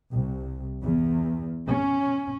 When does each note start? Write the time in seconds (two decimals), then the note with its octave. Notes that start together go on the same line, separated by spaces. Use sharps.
0.10 C2
0.81 E2
1.67 C#4